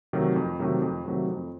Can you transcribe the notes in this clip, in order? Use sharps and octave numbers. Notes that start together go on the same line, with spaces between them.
C3 D#3 F#3 A3
F2
C3 D#3 F#3 A3
F2
C3 D#3 F#3 A3
F2